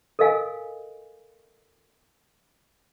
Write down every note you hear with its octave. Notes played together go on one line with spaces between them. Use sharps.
A4 A#4 D#5 F5 G#5